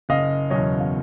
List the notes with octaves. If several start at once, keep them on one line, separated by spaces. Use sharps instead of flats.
F#1 D#5 F5
E2 B2 F#3 C#5 D#5
F5